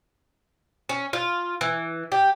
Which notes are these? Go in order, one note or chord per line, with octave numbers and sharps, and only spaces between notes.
C#4
F4
E3
G4